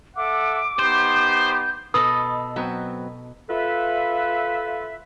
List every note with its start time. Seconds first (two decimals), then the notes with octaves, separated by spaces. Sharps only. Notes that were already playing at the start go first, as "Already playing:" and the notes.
0.16 A4 E5 F#5 D6
0.79 B3 D#4 G4 C5 G6
1.94 B2 A4 B4 D#5 D#6
2.56 F#3 B3 C4 B4
3.50 F4 A4 B4 E5